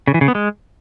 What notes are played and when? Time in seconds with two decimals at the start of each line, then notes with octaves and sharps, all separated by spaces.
0.07 C#3
0.14 E3
0.21 C#3
0.28 B3
0.35 G#3